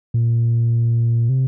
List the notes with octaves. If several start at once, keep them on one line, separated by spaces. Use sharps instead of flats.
A#2
C3